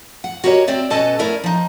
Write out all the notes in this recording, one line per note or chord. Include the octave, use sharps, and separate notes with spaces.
F#5
F#4 G4 A#4 C5 C#5 D#5
C4 C5 D5 E5
B2 B3 C#4 A4 D#5 A5
A3 B3 E4 A#4 C#5 D5
F3 D#4